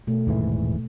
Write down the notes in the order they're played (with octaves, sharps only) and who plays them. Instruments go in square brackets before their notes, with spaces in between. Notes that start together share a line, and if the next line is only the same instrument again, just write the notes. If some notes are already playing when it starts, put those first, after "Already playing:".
[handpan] B2 A3
[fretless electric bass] D#1 G#2 E3